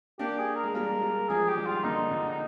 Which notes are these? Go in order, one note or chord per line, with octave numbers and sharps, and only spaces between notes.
A#3 D4 G4
G#4
A#4
G#3
G3 A#3 A#4
G#3
G3 A#3
F3 G#3 G#4
G#3 G4
D#3 G3
F4
A#2 D3 D#4
A#2 D3
D#4